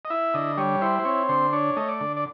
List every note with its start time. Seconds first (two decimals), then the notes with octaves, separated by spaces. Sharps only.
0.05 D#5
0.10 E4 E5
0.34 D3 D#5
0.57 G3 C#5
0.81 E4 C5
0.99 C5
1.05 C4 C#5
1.29 D3 C5
1.53 D4 C#5
1.77 A3 D#5
1.88 D5
2.01 D3
2.17 D5